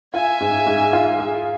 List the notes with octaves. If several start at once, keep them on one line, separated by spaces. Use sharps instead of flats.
F4 E5 G#5
G#2
G#2
F4
G#4